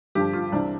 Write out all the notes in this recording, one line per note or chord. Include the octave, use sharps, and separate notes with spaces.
G2 D3 F3 G4
F4
C2 C3 E3 D4